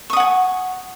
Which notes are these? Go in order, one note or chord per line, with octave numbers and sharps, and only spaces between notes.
F#5 G#5 C#6 D#6